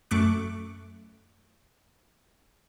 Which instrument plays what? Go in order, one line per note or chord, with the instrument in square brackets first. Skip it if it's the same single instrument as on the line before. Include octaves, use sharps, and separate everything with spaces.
[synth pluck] F#2 A3 C#6 D6 F#6